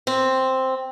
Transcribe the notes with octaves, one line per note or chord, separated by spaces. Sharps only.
C4